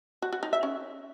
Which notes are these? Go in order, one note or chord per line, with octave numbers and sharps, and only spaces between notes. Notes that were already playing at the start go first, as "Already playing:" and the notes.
F#4
F#4
D#4
E5
C#4